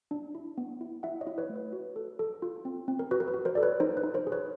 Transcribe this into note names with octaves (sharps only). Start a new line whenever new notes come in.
D4
E4
B3
E4
E4 E5 F#5
C#5 D#5
E4
B4 C#5
A3
B4
F#4
A4
A4
F4
C4
C4
A#4
F#4 B4
A#4
B4
F#4
A#4 C5
A4 D5
B4 C#5
D#4 A#4 C5
B4
D#4
A#4 C5
G#4
B4 C#5